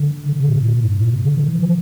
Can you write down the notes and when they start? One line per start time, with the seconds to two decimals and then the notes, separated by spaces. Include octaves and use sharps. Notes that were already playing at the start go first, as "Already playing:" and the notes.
Already playing: D3
0.32 D3
0.40 C3
0.48 A#2
0.56 C3
0.63 A2
0.67 A#2
0.84 G2
1.02 A#2
1.13 C3
1.25 D3
1.37 E3
1.48 E3
1.59 F3